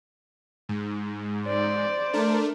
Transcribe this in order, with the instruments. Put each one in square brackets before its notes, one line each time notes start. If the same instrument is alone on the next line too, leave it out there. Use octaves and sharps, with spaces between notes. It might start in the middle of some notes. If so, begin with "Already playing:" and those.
[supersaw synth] G#2
[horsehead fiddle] C5 D5
[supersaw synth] A3 D4 A#4